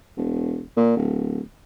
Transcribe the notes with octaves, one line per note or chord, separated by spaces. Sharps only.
E1
A#2
D1